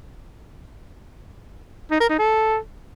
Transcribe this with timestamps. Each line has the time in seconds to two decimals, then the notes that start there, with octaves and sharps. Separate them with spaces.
1.91 D#4
2.00 A#4
2.10 D#4
2.19 A4